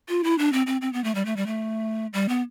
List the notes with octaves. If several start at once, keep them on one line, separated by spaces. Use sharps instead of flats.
F4
E4
D4
C4
C4
C4
B3
A3
G3
A3
G3
A3
G3
B3